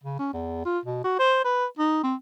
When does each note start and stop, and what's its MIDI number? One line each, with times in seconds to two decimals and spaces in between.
0.03 0.19 49
0.19 0.29 61
0.33 0.65 40
0.65 0.78 65
0.85 1.00 47
1.04 1.17 66
1.19 1.39 72
1.44 1.65 71
1.78 2.03 63
2.03 2.15 60